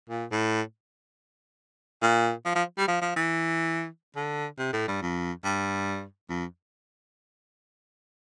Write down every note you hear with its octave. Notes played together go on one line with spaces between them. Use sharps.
A#2
A2
A#2
F3
F3
G3
F3
F3
E3
D3
C3
A2
G2
F2
G2
F2